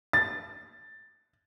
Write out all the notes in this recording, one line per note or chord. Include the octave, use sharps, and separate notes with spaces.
A6